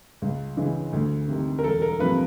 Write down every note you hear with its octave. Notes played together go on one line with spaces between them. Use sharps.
C#2
C#3 E3 G#3
D2
C3 D#3
A#4
E1 A4
A#4
C3 F3 B4